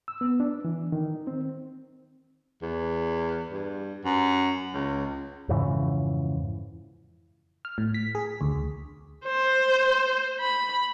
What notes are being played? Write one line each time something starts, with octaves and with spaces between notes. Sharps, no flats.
E6
B3
D4
E3
D#3
C4
E2
G2
F#2
C#2
F2 G#2 C#3 E3
F6
A2
B6
G#4
D2
C5
B5